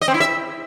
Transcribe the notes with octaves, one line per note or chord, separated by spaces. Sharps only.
D#5
C4
E4
E5